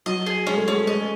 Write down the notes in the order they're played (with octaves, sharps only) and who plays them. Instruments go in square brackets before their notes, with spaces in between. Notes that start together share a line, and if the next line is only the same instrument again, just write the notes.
[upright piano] F#3 [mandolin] D#5
[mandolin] G#4
[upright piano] G#3 [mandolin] C#4
[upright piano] A3
[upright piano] G#3 [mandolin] C#4
[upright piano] A3
[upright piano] G#3 [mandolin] D#5